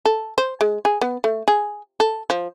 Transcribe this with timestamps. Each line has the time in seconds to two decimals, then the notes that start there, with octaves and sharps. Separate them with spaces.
0.05 A4
0.38 C5
0.61 G#3
0.85 G#4
1.01 B3
1.24 A3
1.48 G#4
2.00 A4
2.30 F3